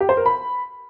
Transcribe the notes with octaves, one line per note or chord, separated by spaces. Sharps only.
G4
C5
A#4
B5